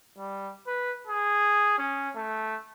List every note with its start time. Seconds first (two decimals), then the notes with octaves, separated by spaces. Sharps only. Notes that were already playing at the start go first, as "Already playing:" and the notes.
0.18 G3
0.67 B4
1.07 G#4
1.78 C#4
2.16 A3